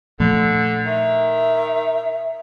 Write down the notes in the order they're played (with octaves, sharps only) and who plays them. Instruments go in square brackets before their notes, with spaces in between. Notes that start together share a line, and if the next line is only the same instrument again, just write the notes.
[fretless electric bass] A#2 F3 A3 [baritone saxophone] D3
[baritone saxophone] D#3 [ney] E5